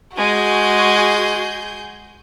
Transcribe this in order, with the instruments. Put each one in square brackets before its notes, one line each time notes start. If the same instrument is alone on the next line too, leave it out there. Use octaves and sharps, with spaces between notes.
[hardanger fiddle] G#3 [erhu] F#4 [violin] G#4 G6